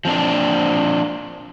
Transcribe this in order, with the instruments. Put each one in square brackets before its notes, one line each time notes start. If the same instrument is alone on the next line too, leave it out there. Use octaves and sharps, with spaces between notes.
[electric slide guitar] F3 C4 D4